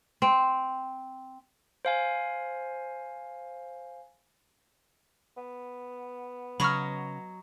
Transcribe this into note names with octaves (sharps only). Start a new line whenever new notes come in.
C4
C5 F5 G#5
B3
C#3 F#3 C#5 D#5 B5 C#6 F6